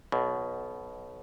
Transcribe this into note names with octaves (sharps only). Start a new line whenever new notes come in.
B1 B2